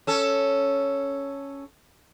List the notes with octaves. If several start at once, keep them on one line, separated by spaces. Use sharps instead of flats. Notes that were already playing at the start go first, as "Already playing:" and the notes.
C#4 A4